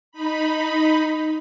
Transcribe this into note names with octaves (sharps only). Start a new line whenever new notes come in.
D#4 B5